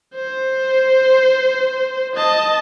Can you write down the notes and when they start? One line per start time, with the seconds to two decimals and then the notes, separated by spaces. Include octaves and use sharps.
0.15 C5
2.16 D#5 A5